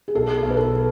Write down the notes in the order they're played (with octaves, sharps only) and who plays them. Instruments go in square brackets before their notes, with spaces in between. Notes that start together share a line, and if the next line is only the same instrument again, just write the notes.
[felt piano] G#4
[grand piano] B1 [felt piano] A4
[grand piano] B1
[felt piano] B4
A4